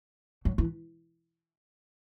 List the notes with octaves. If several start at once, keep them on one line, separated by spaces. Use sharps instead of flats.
F#3
E3